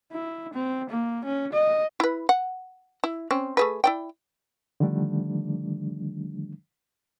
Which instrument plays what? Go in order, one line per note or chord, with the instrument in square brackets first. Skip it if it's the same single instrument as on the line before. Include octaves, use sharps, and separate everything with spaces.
[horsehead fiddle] E4
C4
A#3
C#4
D#5
[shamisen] E4 B4
F#5
E4
C4 C#4
A3 G#4 B4
E4 D5 G5
[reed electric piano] D3 D#3 F3 G3 A3 D4